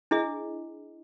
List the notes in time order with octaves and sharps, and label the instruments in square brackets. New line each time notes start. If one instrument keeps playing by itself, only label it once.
[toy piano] D4 E4 G#4 D#5